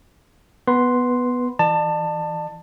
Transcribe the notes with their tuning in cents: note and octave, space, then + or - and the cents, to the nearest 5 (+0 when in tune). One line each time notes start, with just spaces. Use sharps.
B3 +0 B4 +0 C6 +0
E3 +0 D5 +45 A5 +15